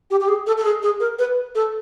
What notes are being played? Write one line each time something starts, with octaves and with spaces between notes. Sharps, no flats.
G4
G4
G#4
A4
A4
G#4
G#4
A#4
B4
A4